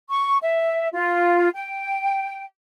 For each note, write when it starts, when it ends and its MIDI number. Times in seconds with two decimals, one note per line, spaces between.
0.10 0.37 85
0.42 0.88 76
0.93 1.48 65
1.55 2.43 79